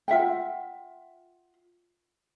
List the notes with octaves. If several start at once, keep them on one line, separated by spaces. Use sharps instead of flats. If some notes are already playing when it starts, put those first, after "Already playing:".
F4 E5 F#5 G5